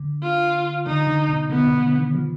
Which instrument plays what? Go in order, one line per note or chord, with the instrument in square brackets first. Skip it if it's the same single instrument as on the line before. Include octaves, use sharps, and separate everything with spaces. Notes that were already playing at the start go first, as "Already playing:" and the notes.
Already playing: [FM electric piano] D3
[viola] F4
[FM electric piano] D3 [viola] D#4
[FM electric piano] D3
B2
[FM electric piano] D3 [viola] B3
[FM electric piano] B2
D3
D#3
F3